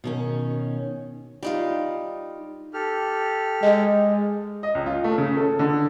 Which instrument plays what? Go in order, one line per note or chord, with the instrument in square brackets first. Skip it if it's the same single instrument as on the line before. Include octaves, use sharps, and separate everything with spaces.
[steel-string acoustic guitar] B2 D#3 C#4
[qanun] G3 D#4 F4
[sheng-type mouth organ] G4 A4 F6
[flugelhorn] G#3 [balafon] D#5
[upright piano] D#5
C#2
F4
A3
C#3
A4
D3